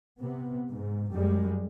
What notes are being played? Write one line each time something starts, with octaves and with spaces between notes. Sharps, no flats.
C3 B3
G#2
F#2 G3 G#3